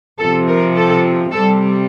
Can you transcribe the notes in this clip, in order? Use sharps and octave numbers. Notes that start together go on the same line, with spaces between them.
C3 F3 A4
A#4
A4
C3 G3 A4